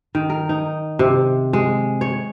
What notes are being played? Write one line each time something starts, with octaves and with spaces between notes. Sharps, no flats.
D#3
A#4
D#4
C3
G#3
C#5